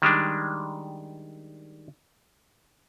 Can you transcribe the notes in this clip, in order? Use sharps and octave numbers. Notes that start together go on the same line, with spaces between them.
D#3 G3 G#3 D4